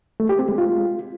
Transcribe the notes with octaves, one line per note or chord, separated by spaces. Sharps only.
A3
G4
C4
G#3
F4